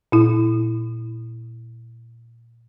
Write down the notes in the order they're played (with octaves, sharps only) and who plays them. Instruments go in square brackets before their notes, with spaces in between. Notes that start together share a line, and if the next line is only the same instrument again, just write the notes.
[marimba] A#2 E4